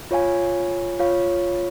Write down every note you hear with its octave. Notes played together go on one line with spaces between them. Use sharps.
F4 C#5 F5 G#5
F4 C#5 F5